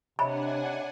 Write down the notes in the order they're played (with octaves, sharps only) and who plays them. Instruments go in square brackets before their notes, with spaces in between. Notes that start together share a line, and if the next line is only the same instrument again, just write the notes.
[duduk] C3 [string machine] D4 F#5 G#5 [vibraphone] C#5 D#5 E5 [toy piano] B5